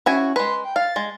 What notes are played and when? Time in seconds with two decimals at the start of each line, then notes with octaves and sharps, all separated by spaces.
0.06 C#4 E4 F#4 G#5
0.36 G#3 B4 C6
0.64 G5
0.76 F5 A6
0.96 G#3